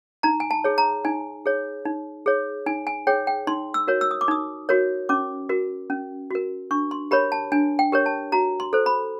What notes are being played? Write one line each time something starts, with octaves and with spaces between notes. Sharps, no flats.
D#4 A#5
G#5
A5
G#4 C#5
A#5
D#4 G#5
G#4 C#5
D#4
G#4 C#5
D#4 G#5
G#5
G#4 C#5 G5
G5
D#4 C6
E6
F#4 A#4 C#5
E6
D#6
D6
D#4 D#6
F#4 A#4 C#5
C#4 D6
F#4 A#4
C#4
F#4 A#4
D4 C#6
C6
G4 A#4 C#5 B5
A5
D4 G#5
G5
G4 A#4 C#5
A5
F#4 A#5
C6
A4 C5
B5